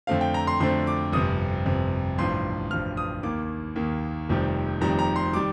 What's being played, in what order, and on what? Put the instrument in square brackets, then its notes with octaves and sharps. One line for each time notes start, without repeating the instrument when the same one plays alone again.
[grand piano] F2 D3 A3 C4 F5
G5
A#5
C6
F2 D3 A3 C4 C6
D6
G1 F2 C3 D#6
G1 F2 C3
A1 G2 F3 C6
A1 G2 F3 F6
D#6
D#2 D#3 A#3 D6
D#2 D#3 A#3
F1 F2 C3 D#3 G3
F1 F2 C3 D#3 G3 A#5
A#5
C6
D#3 G3 D6